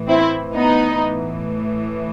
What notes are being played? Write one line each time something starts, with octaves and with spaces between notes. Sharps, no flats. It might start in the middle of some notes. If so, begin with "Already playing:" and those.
Already playing: A2 E3
C4 E4
B3 D#4
A2 E3